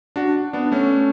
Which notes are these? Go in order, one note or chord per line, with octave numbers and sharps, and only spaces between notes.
D4 F#4
B3 D4
A3 C#4